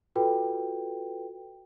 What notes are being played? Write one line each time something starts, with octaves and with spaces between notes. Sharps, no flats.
F4 F#4 A4 B4 G5